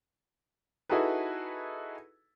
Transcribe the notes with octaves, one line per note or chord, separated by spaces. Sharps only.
D#4 E4 F#4 G#4 A4 B4